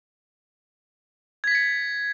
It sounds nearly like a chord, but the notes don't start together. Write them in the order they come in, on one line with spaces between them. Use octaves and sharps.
G#6 B6 A6 C#7